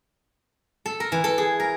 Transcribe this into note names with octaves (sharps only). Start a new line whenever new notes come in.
A4
A#4
E3
A4
G#4
A#4